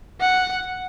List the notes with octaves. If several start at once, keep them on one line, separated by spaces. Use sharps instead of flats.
F#5